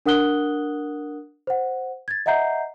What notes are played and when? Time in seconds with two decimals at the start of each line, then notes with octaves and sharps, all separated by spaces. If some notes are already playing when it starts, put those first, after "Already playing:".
0.06 D4 A#4 F#5 D#6 F#6 G7
1.47 C5 F#5
2.08 G#6 A6
2.26 D#5 E5 F#5 A#5 G6 C7